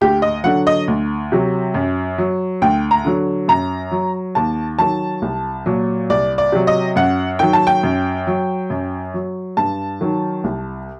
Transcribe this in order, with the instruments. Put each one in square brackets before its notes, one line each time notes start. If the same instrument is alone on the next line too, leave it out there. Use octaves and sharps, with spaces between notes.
[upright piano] D2 G4
D#5
D3 F#3 F#5
D#5
D2
C3 F#3
F#2
F#3
D2 G5
A#5
D3 F#3
F#2 A#5
F#3
D#2 A5
D#3 F#3 A5
C2
A#2 F#3
C2 D5
D5
C3 F#3
D#5
F#2 F#5
D#3 F#3 G5
A5
G5
F#2
F#3
F#2
F#3
G2 A5
D#3 F#3
C2